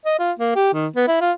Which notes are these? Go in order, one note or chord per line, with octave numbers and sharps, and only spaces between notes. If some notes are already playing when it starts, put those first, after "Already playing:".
D#5
F4
A#3
G4
D#3
B3
E4
F4